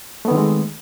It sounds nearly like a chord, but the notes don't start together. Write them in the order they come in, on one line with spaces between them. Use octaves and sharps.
A3 B3 D#3 C4 G#3